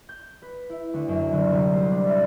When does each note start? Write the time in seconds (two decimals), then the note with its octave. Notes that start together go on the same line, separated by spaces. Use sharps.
0.09 G6
0.42 B4
0.70 E4
0.94 D2
1.08 F#2
1.33 D3
1.52 C2
1.73 C5
1.91 D4
2.06 E5